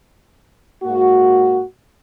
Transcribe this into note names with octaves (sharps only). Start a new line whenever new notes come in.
G#2 A#3 F#4